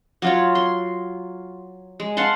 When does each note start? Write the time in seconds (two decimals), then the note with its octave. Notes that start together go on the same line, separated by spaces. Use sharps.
0.22 F#3 F4 C#5
0.55 C6
2.00 G#3
2.17 F5 F#5 A5 C6